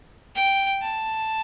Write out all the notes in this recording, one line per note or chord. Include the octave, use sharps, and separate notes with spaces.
G5
A5